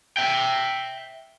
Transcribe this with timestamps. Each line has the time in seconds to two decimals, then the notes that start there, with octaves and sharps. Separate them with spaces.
0.17 E5 G5